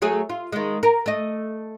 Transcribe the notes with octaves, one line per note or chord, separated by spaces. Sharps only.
F#3 A3 G#4
F4
D#3 G#3
A#4
A3 D#5